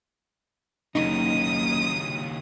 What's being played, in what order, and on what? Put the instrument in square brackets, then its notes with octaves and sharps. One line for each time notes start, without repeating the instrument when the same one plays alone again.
[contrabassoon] F#1 [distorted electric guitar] D#2 C#3 [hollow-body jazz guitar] D#4 [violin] D#6